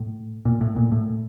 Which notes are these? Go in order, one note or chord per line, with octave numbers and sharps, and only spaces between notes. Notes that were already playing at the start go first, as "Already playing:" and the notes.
Already playing: A2
A#2
A2
A#2
A2